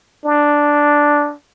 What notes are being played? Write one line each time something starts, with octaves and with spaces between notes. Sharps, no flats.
D4